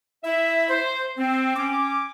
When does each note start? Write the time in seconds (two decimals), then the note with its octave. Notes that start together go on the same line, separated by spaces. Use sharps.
0.24 E4 E5
0.70 C5
1.17 C4
1.56 C#4 D6